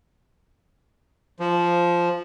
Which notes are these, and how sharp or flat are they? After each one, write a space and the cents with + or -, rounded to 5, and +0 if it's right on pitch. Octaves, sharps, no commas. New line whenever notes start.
F3 -5